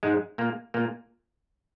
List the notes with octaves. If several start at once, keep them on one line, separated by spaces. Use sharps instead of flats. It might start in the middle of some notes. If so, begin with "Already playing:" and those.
G#2 G#3
A#2 A#3
A#2 A#3